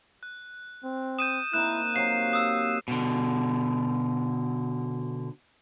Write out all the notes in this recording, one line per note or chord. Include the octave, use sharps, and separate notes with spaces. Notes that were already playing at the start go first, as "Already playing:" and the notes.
F#6
C4
D#6 G6 D#7 E7
A#3 C4 D#4 E4 F#6 E7
C3 F#3 F#4 F5 C7 D#7 E7
D#6 E6
B2 D3